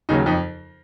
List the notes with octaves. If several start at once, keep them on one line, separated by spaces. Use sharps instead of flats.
D#2 C#3 F#3 D#4
F2 D#4